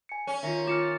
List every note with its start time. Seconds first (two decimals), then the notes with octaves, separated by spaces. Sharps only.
0.09 G#5 C#7
0.27 C#4
0.43 D#3 F4 E5
0.67 F4 A5 D6 F6 C#7